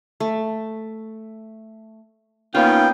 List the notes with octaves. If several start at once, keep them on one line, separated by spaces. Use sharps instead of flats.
A3
A#3 B3 C#4 D#4 F4 D#5 F5 G5